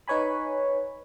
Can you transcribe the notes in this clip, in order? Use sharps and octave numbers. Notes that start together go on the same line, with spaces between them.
D#4 B4 C#5 G#5 B5